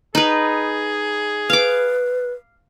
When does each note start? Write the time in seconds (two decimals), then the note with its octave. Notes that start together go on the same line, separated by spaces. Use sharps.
0.15 D#4 G#4 B4
1.50 B4 F5 D6